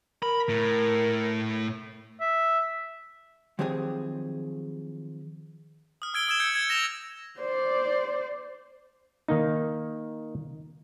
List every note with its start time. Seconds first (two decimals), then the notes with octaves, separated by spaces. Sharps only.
0.23 A#4 B5
0.49 A2
2.21 E5
3.59 D#3 F3 F#3 C4 G4 G#4
6.02 D#6 F6
6.14 E6 G#6 D7 G7
6.28 D#6 E6 G#6 E7
6.40 E6 G6 G#6 C#7
6.55 G#6 C#7
6.70 A#6 E7 F7
7.40 C5 D5
9.28 D#3 A#3 D#4